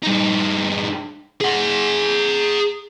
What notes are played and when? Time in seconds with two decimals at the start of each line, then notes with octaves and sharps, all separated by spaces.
0.03 G2 D#4
1.41 G#4 F#5